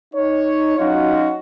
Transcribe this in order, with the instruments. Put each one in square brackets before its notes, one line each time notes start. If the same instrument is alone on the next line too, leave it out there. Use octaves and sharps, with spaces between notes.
[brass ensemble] D#4 C#5
F#3 C#4 D#4 F4 F#4